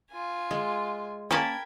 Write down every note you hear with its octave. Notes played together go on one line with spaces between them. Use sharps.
F4 G#5
G#3
A#3 C#4 A#4 G5 A5 B5 G#6